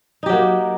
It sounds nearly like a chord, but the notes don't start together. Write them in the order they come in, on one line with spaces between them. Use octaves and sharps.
D#4 G4 F#3 A#3